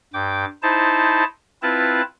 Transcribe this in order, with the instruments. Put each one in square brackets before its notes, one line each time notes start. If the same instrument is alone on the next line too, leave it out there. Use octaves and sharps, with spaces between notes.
[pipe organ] G2 G5 D6
D#4 E4 C5 A5
C4 E4 F4 B4 A5